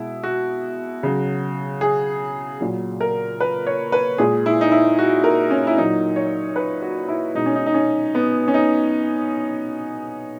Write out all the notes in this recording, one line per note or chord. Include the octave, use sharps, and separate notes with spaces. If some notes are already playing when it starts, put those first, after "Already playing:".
Already playing: B2 G#3 E4
F#4
C#3 F#3
G#4
A#2 F#3
A#4
B4
C#5
B4
A#2 G#3 G#4
E4
D#4
E4
F#4
A#4
C#4
E4
A#2 F#3 D#4
C#5
B4
F#4
E4
B2 G#3 D#4
C#4
D#4
D#4
C#4
B3
C#4
D#4